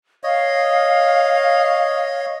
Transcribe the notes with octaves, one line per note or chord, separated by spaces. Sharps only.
C#5 D#5 F5